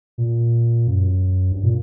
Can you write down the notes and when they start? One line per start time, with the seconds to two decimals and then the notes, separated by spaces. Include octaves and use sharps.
0.18 A#2
0.87 F#2
1.52 G2
1.64 A#2